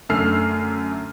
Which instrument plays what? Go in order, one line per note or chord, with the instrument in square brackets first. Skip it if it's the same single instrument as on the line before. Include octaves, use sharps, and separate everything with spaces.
[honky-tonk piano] F#2 D3 A3 E6 F6 C7